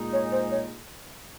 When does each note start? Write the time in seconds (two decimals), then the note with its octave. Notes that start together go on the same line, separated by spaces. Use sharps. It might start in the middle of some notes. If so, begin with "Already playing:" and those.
Already playing: A#2 G#3 D#4
0.13 C#5
0.32 C5
0.51 C#5